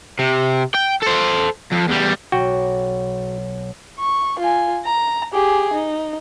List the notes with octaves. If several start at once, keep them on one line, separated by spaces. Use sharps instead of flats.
C3
G5
A4 C5
F2
E2 G3
B1 F#4 G5
C#6
F4 G#5
A#5
G4 G#4
D#4